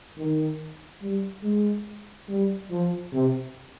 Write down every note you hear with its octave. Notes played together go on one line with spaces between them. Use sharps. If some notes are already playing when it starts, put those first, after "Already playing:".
D#3
G3
G#3
G3
F3
C3